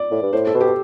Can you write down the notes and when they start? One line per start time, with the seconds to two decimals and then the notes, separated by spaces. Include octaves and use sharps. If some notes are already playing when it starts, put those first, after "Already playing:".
Already playing: D5
0.11 A2
0.22 G2
0.33 A2 C5
0.47 A4
0.54 B2
0.61 G4